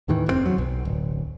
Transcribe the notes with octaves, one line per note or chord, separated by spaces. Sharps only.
D#2 A2 D#3 E3
F1 A#2 C4
F#3
B1
D1